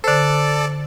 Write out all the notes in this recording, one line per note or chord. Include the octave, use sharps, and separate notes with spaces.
D3 A4 C5 D5